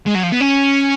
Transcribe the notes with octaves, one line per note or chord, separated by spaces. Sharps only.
G#3
F#3
F3
B3
C#4